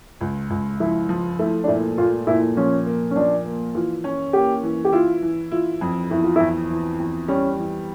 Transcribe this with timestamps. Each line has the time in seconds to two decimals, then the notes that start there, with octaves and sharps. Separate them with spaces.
0.21 C#2
0.50 C#2
0.80 F3 E4
1.09 F3
1.39 A3 E4
1.64 D4
1.68 A#2 E4
1.98 A#2 F4
2.27 A#2 E4
2.57 F3 C#4
2.86 A#3
3.11 C#4
3.16 F3 D4
3.45 A#3
3.75 E3 F4
4.04 C#4
4.33 A#3 G4
4.63 E3
4.85 G4
4.93 E4 F4
5.22 E3
5.52 E4 F4
5.81 F2
6.11 E2 E4
6.24 F4
6.36 E2 E4
6.70 E3
7.00 E2
7.28 G3 C#4
7.58 E3